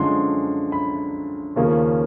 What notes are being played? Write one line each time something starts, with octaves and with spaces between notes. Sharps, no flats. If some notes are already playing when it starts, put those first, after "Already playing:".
Already playing: F#2 D3 F3 G#3 C6
B5
D#2 C#3 F3 A#3 C#4